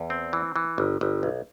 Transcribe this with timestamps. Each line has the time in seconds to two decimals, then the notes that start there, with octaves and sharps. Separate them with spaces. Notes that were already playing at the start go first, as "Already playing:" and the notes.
Already playing: E2
0.10 C4
0.33 E3
0.56 E3
0.78 G1
1.01 G1
1.23 B1